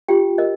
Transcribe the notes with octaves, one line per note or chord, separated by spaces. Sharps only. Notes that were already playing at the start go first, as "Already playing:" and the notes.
F4 G4 G5
A#4 D#5